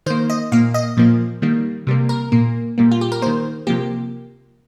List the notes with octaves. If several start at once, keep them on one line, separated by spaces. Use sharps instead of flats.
D#3 A#3 C5
D#5
A#2 A#3 F5
D#5
A#2 F3 A#3
D#3 G3 A#3
C3 G3 A#3
A#4
A#2 A#3
A#2 G3 A#3
F4
G4
A#4
D#3 A#3 C5
C3 F3 A#3 G4